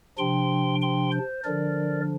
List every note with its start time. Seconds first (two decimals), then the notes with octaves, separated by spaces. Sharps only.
0.18 C3 F3 D4 G5 C6
0.82 G5 C6
1.12 C5
1.44 D3 F3 D4 A#4 D5